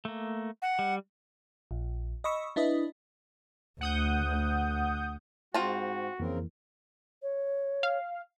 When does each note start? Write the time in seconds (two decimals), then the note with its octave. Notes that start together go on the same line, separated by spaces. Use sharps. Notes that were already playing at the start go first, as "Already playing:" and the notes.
0.05 A3 A#3
0.62 F#5
0.79 G3
1.71 A#1
2.24 D#5 B5 C#6 E6
2.56 D4 E4 B4 D#5
3.81 D2 F#5 D#6 G6
5.54 G#2 C4 F4 F#4 A5
6.19 F2 C#3 E3 A#3 C4 A#4
7.23 C#5
7.83 F5